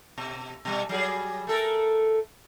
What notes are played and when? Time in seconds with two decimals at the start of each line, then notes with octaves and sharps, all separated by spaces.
0.18 B2
0.65 B2 G3
0.89 F#3 G3 G#4
1.47 A3 A4 A#4